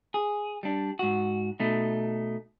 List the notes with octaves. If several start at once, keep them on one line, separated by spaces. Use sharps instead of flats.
G#4
G3 D4
G#2 F#4
B2 A3 D#4